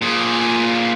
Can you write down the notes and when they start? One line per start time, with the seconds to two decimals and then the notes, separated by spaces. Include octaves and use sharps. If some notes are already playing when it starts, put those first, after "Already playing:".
0.02 A#2 G#4